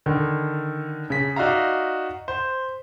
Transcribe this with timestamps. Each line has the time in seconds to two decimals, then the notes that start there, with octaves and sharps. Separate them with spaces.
0.06 D3 D#3
1.10 C#3 B6
1.36 D#4 F#4 D5 E5 F5 A#5
2.28 C5